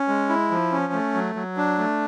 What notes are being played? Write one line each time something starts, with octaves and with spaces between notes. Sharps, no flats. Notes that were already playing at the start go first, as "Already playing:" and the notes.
Already playing: C#4
G#3
E4
F3
C#4
A3
F#3
F#3
D4
A3